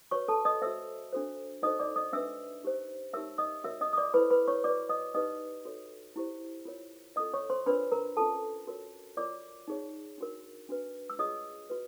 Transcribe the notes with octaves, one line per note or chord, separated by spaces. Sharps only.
F#4 B4 C#5 C#6
A4 A5
D#5 D#6
F#4 A4 C5 E5 E6
D4 F#4 A4 C5
D#4 F#4 A4 C5 D#5 D#6
D5 D6
D#5 D#6
D4 F#4 B4 E5 E6
D#4 G4 C5
D#4 G4 A#4 C#5 E5 E6
D#5 D#6
F#4 A#4 C#5 E5 E6
D#5 D#6
D#6
D5 D6
E4 A4 B4 C5 B5
B4 B5
C#5 C#6
F#4 B4 D5 D6
D#5 D#6
D#4 G4 B4 D#5 D#6
F#4 A4 C#5
E4 G4 C5
F4 A#4 C#5
C#4 F4 A4 D#5 D#6
C#5 C#6
C5 C6
D4 F4 A#4 B4 C#5 B5
A#4 A#5
C#4 F4 A4 A5
F#4 A#4 C#5
F4 A#4 C#5 D5 D6
D#4 G#4 C#5
D4 F#4 A#4
D4 F#4 B4
E6
F4 G#4 C#5 D#5 D#6
F#4 B4